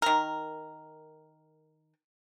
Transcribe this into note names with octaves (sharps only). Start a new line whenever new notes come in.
D#3 A#4